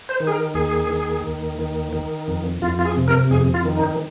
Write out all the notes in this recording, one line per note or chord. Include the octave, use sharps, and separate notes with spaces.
C5
D#3
G#4
A#4
D#2 G#4
D#3
D#2
D#3
D#3
F2
F2 F4
F4
G#4
C3
A#4
F2 G#4
F4
D#3
D#4